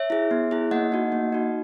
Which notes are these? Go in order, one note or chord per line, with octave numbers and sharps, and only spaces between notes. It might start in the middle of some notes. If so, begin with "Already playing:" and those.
Already playing: C#5 E5
E4 G#4
B3
E4 G#4
A#3 D#5 F#5
D#4 F#4
A#3
D#4 F#4